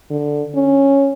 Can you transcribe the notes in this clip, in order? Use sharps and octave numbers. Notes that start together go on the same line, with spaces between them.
D3
C#4